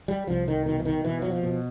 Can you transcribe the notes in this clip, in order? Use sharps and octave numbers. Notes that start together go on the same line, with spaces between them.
G3
C2 F3
D#3
B2 D#3
E3
D#3
B2 E3
F#3
F3
B2